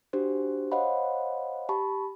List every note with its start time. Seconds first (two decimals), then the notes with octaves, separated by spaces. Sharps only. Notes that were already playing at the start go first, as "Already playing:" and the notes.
0.13 D4 F#4 G4 C5
0.72 C5 C#5 D#5 F5 F#5 B5
1.69 G4 A5 B5 C#6